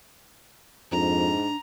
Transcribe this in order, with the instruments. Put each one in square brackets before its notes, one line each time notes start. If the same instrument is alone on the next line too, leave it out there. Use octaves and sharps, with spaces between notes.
[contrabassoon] F2 [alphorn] G#2 [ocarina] D4 [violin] A#5